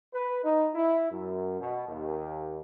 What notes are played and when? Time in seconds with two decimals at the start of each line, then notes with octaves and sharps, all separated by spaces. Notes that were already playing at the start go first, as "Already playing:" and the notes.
0.14 B4
0.44 D#4
0.75 E4
1.11 F#2
1.60 B2
1.89 D#2